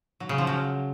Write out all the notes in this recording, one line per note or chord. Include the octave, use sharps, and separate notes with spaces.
F#3
C#3
F3
F#3